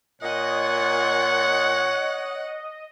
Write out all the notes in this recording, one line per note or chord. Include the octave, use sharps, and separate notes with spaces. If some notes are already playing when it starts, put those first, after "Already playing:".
A#2 C#5 D#5 F#5